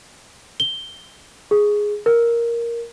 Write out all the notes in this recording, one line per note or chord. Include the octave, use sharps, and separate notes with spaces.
G7
G#4
A#4